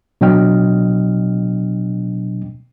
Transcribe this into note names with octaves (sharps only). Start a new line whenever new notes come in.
B2 F#3 D4 D#5 G5 F6